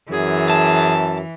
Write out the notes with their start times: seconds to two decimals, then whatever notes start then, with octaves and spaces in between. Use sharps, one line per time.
0.11 F#2 E3 G#4
0.50 A5